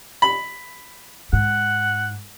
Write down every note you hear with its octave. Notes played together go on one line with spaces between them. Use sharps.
B5
G#2 F#5